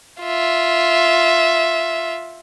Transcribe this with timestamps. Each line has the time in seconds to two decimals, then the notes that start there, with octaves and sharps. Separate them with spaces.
0.21 F4 E5